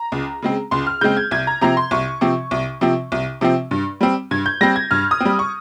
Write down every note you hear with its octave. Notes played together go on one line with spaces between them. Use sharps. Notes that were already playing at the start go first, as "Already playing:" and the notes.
Already playing: A#5
C#2
C#3 G#3 C4
C#2 C6
F6
C#3 G#3 C4 G6
G#6
C2 G#6
A#5
C3 F3 C4 A#5
C6
C2 C#6
C3 F3 C4
C2
C3 F3 C4
C2
C3 F3 C4
G2
G3 C4
G2 G#6
G6
G3 C4 A#6
G#6
G2 F6
D#6
G3 C4
C#6